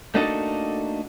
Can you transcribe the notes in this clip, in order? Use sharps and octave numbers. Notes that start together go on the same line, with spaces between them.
A3 A#3 D4 D#4 F#4 A4